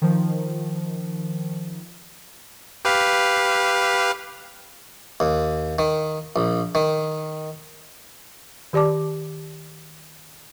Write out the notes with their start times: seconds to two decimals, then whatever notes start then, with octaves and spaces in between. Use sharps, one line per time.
0.02 D#3 F3
2.85 G4 B4 F5
5.20 D#2
5.79 D#3
6.36 A#1
6.75 D#3
8.73 D#3 G4 D5 A5 D6